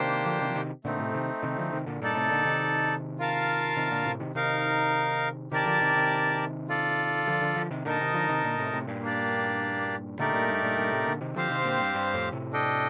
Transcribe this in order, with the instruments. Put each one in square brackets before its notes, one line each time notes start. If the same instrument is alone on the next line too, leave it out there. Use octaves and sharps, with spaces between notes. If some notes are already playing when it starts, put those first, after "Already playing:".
Already playing: [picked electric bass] C3 D#3 [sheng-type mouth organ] A#3 D4 G4 C5 G5
[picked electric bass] D3 F3
C3 D#3
F3
C3 D#3
[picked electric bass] A#2 D3 [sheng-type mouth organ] A3 C4 D#4
[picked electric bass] A2 C3
C3 D#3
C3 D#3
D3 F3
C3 D#3
A#2 D3
[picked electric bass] G2 A#2 [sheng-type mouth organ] D#4 A4 D5 A5
[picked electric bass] A2 C3
A#2 D3
C3 D#3
[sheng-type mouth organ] F4 A#4 F5 A5
[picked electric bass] C3 D#3
A#2 D3
A2 C3
C3 D#3
[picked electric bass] C3 D#3 [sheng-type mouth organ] D#4 A#4 F5
[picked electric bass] C3 D#3 [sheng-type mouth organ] G4 A#4 D5 A5
[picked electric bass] D3 F3
C3 D#3
C3 D#3
[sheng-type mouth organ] F4 A4 D5
[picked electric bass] D3 F3
D3 F3
D3 F3
C3 D#3
[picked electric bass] A#2 D3 [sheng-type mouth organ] D#4 A#4 D#5 A5
[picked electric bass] C3 D#3
D3 F3
C3 D#3
A#2 D3
A2 C3
A2 C3
G2 A#2
[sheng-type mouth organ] A#3 D4 G4 D5
[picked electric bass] A#2 D3 [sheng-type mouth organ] A3 D#4 G4 A#4 D5
[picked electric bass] G2 A#2
G2
G2 A#2
G2 A#2
A2 C3
A#2 D3
C3 D#3
[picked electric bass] D3 F3 [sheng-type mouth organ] C4 G4 C5 F5
[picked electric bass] C3 D#3
A#2 D3
G2
G2
F2 A2
A2 C3
[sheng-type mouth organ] D4 A4 D#5 G5